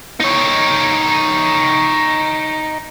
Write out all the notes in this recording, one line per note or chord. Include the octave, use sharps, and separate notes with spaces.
D#4 C#5